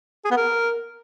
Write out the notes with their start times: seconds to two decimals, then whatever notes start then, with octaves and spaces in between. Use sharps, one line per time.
0.25 G#4
0.31 B3
0.37 A#4